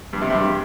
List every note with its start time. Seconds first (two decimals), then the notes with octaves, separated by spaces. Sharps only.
0.13 G2
0.22 C3
0.30 G2